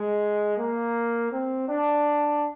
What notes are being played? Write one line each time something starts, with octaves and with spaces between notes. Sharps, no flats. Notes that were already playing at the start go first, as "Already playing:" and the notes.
Already playing: G#3
A#3
C4
D4